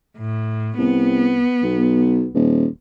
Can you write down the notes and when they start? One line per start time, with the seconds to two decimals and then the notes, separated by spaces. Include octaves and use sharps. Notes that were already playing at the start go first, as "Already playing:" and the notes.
0.18 A2
0.78 C2 B3
1.63 B1
2.35 D#1